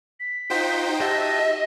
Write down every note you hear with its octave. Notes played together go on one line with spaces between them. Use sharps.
B6
D#4 F4 F#4 C5 G5
F#4 G4 D#5 E5 A5 A#6